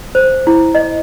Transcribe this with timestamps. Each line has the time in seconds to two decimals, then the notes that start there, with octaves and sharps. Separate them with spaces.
0.15 C5
0.47 E4
0.75 D#5